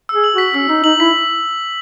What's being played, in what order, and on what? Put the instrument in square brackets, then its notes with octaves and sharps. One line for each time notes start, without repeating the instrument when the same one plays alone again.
[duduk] G#4 [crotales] E6
[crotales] F#7
[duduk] F#4 [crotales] B6
[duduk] C#4 [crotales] E6
[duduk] D#4 [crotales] E6
[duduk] D#4 [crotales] F#7
[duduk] E4 [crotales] B6